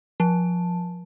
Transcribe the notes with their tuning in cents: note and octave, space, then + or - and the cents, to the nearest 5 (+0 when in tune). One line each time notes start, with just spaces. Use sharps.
F3 +15 A5 +0